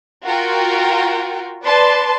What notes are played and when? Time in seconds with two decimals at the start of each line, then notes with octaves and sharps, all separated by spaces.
0.24 F4 F#4 A#4 G5
1.64 B4 D5 A5 C6